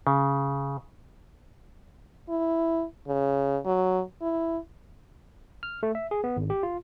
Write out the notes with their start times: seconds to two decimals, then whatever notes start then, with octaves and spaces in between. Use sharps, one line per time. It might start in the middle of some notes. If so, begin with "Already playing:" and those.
0.07 C#3
2.29 E4
3.07 C#3
3.65 F#3
4.21 E4
5.63 F6
5.83 A3
5.95 E5
6.11 G#4
6.24 B3
6.37 G#1
6.50 G4
6.63 F4